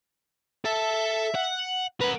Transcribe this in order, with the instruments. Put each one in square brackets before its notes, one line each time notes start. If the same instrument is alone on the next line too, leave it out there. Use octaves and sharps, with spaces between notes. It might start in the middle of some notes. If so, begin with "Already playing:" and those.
[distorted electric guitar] A4 A5 [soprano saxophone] E5
[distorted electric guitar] F#5
[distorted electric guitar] A#4 F#5 [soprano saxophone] B4